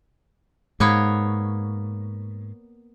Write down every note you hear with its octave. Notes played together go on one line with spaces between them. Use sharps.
G#2 A#3 B3 C#5